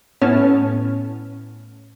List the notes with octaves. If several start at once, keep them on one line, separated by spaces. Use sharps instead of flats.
A2 B3 C#4 C#5 A5 F6